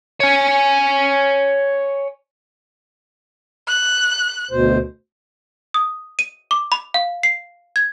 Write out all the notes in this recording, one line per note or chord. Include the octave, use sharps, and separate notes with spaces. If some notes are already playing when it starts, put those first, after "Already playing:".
C#5 G#5
F#6
D2 B2 C5
D#6
D#7
D6
B5
F5
C7
G#6